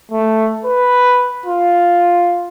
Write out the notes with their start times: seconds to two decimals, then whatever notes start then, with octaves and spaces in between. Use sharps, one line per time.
0.11 A3
0.65 B4
1.46 F4